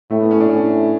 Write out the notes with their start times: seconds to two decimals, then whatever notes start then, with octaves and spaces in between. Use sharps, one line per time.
0.11 A2 A3
0.21 B3
0.31 C#4
0.40 D4
0.50 A2 C#4